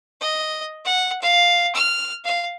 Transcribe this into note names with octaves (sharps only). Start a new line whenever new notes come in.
D#5
F#5
F5
F6
F5